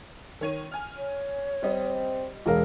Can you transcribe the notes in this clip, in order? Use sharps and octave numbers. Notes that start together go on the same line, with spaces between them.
D#3 C#5 D#7
G#5 F6
C#5
G3 C4 D#5
E1 G#4 A#4 F5